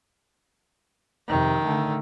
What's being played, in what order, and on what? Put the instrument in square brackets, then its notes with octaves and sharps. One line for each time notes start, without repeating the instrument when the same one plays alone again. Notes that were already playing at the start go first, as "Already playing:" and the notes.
[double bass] F2 C3 [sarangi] D#3
[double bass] D3 A3